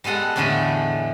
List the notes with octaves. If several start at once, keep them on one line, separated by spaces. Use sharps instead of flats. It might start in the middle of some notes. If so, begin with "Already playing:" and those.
G3 G#3 B3 A4 F#5
E2 A2 D3 G#3 A3 B5